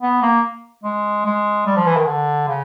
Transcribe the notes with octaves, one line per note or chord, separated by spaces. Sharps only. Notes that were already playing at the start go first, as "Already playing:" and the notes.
B3
A#3
G#3
G#3
G3
F3
E3
D#3
D3
C#3